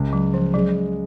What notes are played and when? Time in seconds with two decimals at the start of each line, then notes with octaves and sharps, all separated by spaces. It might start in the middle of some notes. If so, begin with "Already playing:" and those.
Already playing: C#2 C#3 G#3
0.13 F#3
0.34 F3
0.54 C#3 F#3 G#3